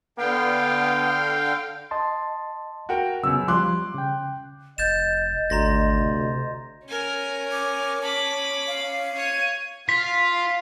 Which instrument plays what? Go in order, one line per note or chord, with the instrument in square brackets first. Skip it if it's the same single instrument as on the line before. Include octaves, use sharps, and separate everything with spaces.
[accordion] D3 F5 G5 [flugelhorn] B3
[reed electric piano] D#5 A5 C6
[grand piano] F#4 A#4 G5
[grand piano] C#2 E6 [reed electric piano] C#3 F#3 B3
[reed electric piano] F3 G3 [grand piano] C6 D6 F#6
[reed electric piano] C#3 G5
[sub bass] F1 [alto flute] D#5 [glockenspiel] G6 A6 E7
[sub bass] G#1 [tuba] D2 [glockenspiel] A#5 C6 A#6
[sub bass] C3
[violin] C#4 [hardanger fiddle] A#4 G#5
[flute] D6
[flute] A5 [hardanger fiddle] B5 D6
[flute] F5
[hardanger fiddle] C#5 [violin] G#6 D#7
[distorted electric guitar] F4 [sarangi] F5 [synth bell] B6